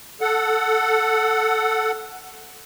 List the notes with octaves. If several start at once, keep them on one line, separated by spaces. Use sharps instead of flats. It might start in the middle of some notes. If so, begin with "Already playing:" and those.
A4 F#5